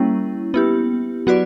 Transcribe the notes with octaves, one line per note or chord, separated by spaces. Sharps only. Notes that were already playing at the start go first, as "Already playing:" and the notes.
Already playing: G3 A#3 C#4 E4
B3 E4 G4
F#3 B3 F#4 B4 D5